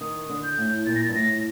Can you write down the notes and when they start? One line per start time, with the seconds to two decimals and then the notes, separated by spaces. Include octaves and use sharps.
0.01 D#3 D#6
0.29 D3
0.43 G6
0.58 A2
0.86 A#2 A6
0.95 A#6
1.04 G2 A6
1.15 A2 A#6